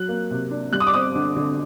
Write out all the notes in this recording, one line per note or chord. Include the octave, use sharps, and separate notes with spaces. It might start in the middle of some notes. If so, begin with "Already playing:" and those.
Already playing: F#3 F#6
A#3
C3
D4
G3 F#6
D#6
D6
C4 D#6
D3
D3